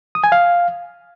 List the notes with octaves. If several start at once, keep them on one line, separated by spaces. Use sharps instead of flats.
D#6
G#5
F5